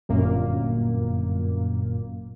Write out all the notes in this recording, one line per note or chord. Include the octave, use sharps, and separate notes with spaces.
G1 F#2 A#2 A#3